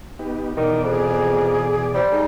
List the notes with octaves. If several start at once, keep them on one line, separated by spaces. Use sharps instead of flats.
B3 D#4 G4
E2 B2 D#3 D5
F2 G#4
G3 C5
G#3 D#4 G#4